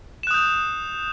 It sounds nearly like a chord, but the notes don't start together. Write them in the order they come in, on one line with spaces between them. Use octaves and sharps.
E7 F#6 D#6 G6